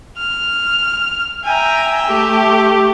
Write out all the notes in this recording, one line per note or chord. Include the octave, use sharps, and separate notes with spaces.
F6
E5 G5 G#5 A#5
A3 G4